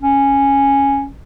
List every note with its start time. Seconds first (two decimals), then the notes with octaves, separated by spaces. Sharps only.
0.02 C#4